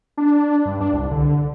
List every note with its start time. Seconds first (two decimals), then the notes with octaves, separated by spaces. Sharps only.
0.17 D4
0.66 G2
0.81 D4
0.94 C2
1.11 D3